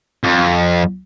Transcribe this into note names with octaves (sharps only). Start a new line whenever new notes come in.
F2